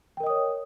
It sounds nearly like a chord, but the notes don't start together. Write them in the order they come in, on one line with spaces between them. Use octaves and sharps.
G5 A#4 D#5 D#6 C#5